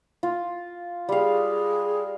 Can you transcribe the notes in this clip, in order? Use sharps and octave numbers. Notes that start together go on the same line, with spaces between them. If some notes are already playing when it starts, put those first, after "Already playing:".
F4
G3 G#4 F5